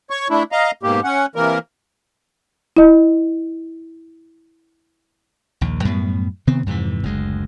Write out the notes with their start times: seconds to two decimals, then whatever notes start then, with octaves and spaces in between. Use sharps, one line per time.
0.10 C#5 C#6
0.30 A3 D4 E4
0.52 D#5 F5 A#5
0.83 G#2 B2 A#3 G4
1.04 C#4 F#5
1.35 C3 E3 A#3 A#4
2.77 E4 D#5
5.61 A#1 D#2
5.85 F#2 A2 G3 B3
6.47 C3 D#3 B3 C4
6.66 F2 G#2 C3 E3
7.03 F#1 D2 G#3